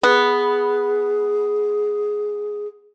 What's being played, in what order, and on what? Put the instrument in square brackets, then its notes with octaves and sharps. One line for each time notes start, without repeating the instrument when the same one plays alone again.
[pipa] B3 [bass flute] G#4